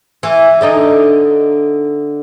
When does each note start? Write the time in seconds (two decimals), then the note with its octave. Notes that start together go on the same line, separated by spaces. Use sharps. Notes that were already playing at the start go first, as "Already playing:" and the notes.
0.23 E3
0.61 D3 D4 D#4